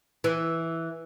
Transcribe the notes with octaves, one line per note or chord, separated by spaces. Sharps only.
E3